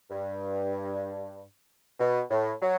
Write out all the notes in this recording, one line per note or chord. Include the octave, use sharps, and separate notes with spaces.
G2
B2
A2
F#3